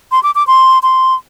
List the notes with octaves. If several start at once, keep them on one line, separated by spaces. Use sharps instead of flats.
C6
D6
D6
C6
C6